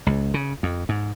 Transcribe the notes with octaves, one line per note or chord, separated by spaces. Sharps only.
C#2
C#3
F2
G#2